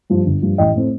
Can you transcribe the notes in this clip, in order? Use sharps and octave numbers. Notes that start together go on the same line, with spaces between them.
G2 F3
G1
G2 F3
A1 D#5 G5
A2 A3 C4